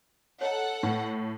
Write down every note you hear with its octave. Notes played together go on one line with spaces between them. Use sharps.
A4 C#5 D#5 F#5 A#5
A2 B4 G5